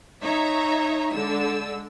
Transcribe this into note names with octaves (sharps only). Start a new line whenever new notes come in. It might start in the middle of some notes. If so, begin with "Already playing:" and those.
D#4 C#5 E5 A#5
D3 G#3 E6